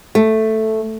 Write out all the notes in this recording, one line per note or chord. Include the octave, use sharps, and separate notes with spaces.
A3